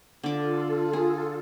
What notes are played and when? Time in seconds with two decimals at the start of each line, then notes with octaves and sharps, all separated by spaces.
0.23 D3 F4 A4 D6
0.93 G#4